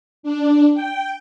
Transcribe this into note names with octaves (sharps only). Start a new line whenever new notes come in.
D4
G5